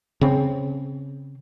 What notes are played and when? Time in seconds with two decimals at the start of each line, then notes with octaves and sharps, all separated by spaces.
0.21 C#3 C4